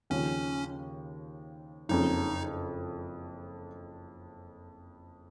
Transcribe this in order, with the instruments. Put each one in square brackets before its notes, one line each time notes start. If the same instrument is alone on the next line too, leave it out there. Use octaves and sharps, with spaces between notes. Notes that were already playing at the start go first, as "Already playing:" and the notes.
[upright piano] D#2 C#3 F3 [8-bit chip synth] C#4
[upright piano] F#1 F2 C#3 [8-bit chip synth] D#4